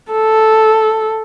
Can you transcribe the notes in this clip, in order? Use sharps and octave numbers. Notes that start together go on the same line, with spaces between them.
A4